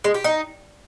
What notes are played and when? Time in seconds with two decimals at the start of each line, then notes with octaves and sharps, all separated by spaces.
0.04 G#3
0.14 G4
0.24 D#4